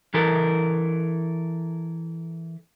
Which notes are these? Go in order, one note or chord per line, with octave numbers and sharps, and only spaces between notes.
E3 A4 A#4